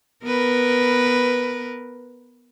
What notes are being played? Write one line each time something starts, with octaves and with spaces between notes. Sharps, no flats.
B3 A#4 B4